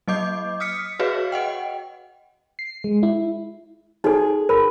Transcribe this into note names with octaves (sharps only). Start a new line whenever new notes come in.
F#3 A#3 D#5 D6 G6
D#6 F6 B6 C#7
F#4 G#4 B4 C#5 D#5 F5
D#5 F#5 G5
C7
G#3
E4
D#4 F#4 G#4 A4
A#4 B5